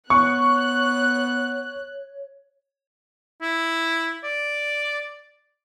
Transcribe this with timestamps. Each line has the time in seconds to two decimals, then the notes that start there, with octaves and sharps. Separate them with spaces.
0.10 B3 C#5 C#6 F#6
3.42 E4
4.23 D5